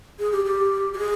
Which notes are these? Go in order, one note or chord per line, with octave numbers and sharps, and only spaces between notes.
G#4
G4
G4
G4
G#4